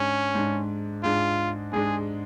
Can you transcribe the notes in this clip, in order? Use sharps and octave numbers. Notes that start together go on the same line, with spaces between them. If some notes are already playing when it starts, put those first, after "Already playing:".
Already playing: G#2 G#3 C#4 D4
G#2 G#3 D4
G#2 G#3 D4 F4
G#2 G#3 D4 G#4